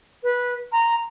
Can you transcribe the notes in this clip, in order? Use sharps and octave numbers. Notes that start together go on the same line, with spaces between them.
B4
A#5 C6